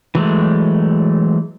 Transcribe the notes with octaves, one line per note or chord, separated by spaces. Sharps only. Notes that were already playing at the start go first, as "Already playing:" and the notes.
E3 F#3 G#3 A3